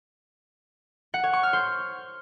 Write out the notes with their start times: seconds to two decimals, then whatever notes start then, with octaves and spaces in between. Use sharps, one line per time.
1.14 F#5
1.24 C#5
1.33 C#6
1.43 F6
1.53 C5